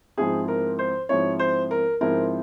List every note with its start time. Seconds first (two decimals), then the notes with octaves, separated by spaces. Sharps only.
0.18 G#2 F3 C4 E4 G#4
0.48 A#4
0.79 C5
1.09 G#2 F3 C4 E4 C#5
1.39 C5
1.71 A#4
2.01 G#2 F3 C4 E4 A#4